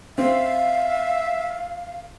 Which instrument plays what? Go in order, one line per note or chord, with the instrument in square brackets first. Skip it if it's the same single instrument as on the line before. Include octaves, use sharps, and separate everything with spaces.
[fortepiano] C4 [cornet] E5 [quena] F5